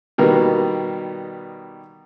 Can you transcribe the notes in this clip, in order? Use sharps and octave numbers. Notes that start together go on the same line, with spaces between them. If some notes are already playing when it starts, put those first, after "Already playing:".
B2 D#3 G3 A#3 B3